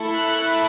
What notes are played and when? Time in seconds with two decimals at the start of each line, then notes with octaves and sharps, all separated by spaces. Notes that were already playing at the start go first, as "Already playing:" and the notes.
Already playing: A3 E4 A4
0.18 F#6